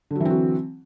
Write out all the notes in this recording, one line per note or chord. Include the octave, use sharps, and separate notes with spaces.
D3 E3 F#3 C4 F#4